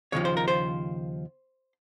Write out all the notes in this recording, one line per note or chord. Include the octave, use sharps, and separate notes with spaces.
D#2 C#3 F3 C#5
C5
A#4
C5